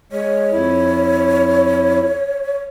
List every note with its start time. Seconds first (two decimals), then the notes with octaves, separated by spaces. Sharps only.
0.12 G#3 C#5
0.53 F2 E4